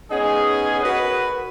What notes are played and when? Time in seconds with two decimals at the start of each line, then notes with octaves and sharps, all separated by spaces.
0.11 B3 C#4 D#4 G#4
0.83 F#4 A#4 B4